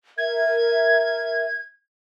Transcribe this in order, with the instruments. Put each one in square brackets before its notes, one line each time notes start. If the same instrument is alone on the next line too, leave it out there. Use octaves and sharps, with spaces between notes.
[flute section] A#4 E5 [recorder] G#6